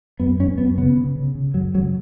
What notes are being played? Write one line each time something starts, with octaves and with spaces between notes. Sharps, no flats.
F#2 B3
F#2 C#4
F#2 B3
C#3 B3
C#3
C#3
C#3
F#2 F#3
C#3 F#3